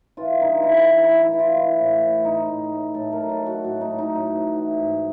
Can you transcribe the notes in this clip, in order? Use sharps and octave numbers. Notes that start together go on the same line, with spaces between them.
E3 F4
G2 D#4
E3 E4
E3
E4
E3
E4
E3 E4
F4
E3 E4
A2
A2
A2 D#4
A2
A2
A2 A4
A#4
F#3
A4
F#3
F#4
A2 F#4
D#4
A2
D#4
A2 D#4
E3
E3
G#2